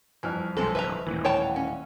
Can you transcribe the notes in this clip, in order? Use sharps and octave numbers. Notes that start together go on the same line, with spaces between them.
C2 F2 E3 F6
B1 G#3 C4 A4
D1 B4 E5 A#5
D#1 A2 E3
C#5 G5 A5
C#4